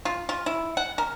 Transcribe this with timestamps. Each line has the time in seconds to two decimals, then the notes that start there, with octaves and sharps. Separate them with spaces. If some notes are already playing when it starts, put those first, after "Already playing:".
0.05 F4
0.29 F4
0.46 E4
0.77 F#5
0.98 A#4